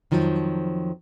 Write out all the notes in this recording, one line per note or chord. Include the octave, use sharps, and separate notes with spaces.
F2 D#3 F3 F#3